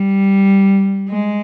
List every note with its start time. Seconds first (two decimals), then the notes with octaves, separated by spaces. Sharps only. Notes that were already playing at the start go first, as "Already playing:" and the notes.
Already playing: G3
1.09 G#3